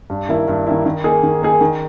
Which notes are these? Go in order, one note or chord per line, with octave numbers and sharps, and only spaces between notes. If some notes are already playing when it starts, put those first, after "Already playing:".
G2
D#3 A#3 E4
G2
D#3 A#3 E4
D#3
A#3 D#4 G#4
D#3
A#3 D#4 G#4
D#3